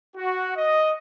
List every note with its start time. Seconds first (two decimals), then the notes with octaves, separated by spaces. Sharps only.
0.16 F#4
0.57 D#5